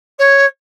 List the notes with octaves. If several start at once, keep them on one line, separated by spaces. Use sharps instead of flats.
C#5